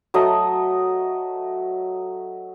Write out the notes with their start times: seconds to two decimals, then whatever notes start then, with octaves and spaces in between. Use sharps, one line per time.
0.14 F#3 A3 D#5